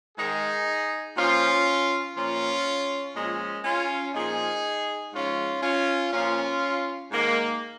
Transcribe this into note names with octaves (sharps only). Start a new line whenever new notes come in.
G#2 D#3 D#4 G#4
A#2 F3 C#4 F4
A#2 F3 C#4 F4
A#2 F3 G#3 C#4
C#4 F4
A#2 F3 D#4 G#4
G#2 F3 C#4 F4
C#4 F4
A#2 F3 C#4 F4
G#2 D#3 A#3